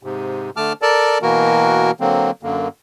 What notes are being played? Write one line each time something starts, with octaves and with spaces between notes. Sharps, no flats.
G#2 C3
D3 A3 A5 D6 F6
A4 A#4 D5 A5
B2 E3 A#3 F#4 A#4
D3 F#3 A#3 C4
F#2 D3 A#3